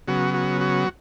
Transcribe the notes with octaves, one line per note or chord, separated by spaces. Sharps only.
C#3 F#3 B3 F#4
F#4
F#4